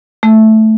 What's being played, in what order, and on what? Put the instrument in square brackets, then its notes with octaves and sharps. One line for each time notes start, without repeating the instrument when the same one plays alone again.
[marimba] A3